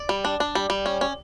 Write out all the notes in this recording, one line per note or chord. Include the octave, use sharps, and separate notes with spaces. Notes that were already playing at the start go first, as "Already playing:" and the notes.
Already playing: D5
G3
D4
D4
G3
G3
C#4
C#4